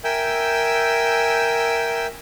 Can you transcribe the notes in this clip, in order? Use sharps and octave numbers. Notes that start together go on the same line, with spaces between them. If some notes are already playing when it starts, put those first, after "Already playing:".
A#4 E5 G5 G#5 E6 G6